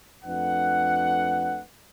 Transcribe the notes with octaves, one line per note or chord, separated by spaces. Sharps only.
F2 A3 D4 B4 F#5